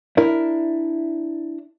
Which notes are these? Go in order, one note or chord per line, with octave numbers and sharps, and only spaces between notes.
D4 E4 A#4